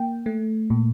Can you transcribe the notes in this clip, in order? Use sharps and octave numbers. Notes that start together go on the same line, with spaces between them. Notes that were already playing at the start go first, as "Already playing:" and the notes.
Already playing: A#3 G5
A3
A#2